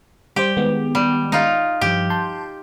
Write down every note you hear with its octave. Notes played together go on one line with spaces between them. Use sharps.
G3 G4 C5
D#3 G#3 B3
G3
D#4 F4
G2 F3 G4
A5 C6 G6